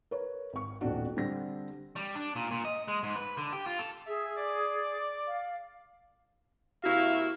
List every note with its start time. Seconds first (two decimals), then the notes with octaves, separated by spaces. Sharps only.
0.11 A#4 B4 C#5
0.53 G#1 C#6
0.81 D#1 A1 C4 D4 F#4
1.17 D3 G3 C4 A#6
1.96 G3
2.15 D4
2.36 A#2
2.51 A#2
2.65 D#5
2.88 G#3
3.03 G#2
3.16 B4
3.37 D3
3.53 G4
3.66 F4
3.79 A4
4.07 G#4 E5
4.37 D5
5.27 F5
6.84 C3 A#3 E4 F#4 F5